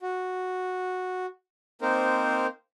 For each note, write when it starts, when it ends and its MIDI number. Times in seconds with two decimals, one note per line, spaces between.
0.01 1.26 66
1.82 2.47 58
1.82 2.47 60
1.82 2.47 63
1.82 2.47 70
1.82 2.47 72